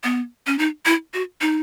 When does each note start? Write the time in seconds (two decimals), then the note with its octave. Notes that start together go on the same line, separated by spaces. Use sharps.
0.04 B3
0.47 C#4
0.59 D#4
0.86 E4
1.14 F#4
1.41 D#4